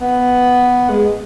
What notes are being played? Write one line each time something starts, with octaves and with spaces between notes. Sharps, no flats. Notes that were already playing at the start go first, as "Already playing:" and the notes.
B3
G#3